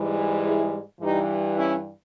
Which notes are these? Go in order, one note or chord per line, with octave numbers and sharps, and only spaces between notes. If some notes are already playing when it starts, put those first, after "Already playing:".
Already playing: G#2 E3 G3
E4 G#4
G2 E3 G3 D#4 G4
C#4 E4